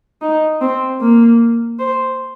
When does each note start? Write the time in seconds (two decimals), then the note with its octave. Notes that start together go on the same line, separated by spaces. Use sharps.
0.22 D#4
0.61 C4
1.00 A#3
1.79 C5